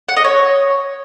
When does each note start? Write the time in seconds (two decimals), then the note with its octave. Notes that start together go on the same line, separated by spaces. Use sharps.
0.09 F#5
0.16 D#5
0.24 C#5